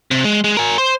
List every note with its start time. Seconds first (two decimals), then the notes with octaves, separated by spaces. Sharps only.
0.11 C3
0.24 G#3
0.44 G#3
0.57 A#4 G#5
0.78 C5